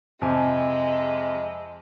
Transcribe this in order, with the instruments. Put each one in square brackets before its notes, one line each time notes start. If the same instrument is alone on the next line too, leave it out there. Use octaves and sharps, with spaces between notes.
[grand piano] F2 C3 G#5 [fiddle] G#3